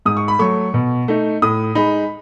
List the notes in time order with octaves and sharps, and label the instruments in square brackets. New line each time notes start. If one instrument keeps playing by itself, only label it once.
[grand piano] G#2 D#6
C#6
B5
F#3 A3 C#6
B2
A3 D#4
A2 D#6
G#3 D#4 B5